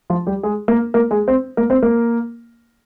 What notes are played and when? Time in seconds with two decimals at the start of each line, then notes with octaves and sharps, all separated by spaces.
0.10 F3 F4
0.27 G3 G4
0.43 G#3 G#4
0.68 A#3 A#4
0.94 A#3 A#4
1.11 G#3 G#4
1.28 C4 C5
1.57 A#3 A#4
1.70 C4 C5
1.82 A#3 A#4